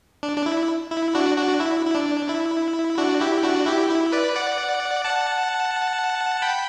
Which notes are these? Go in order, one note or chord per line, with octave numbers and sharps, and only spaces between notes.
D4
D4
E4
E4
D4 F#4
D4 F#4
E4
E4
D4
E4
D4 F#4
E4 G4
D4 F#4
E4 G4
E4
B4 D5
D5 F#5
F#5 A5
G5 B5